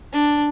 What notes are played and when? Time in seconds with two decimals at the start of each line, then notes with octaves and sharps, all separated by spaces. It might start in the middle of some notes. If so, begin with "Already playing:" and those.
0.13 D4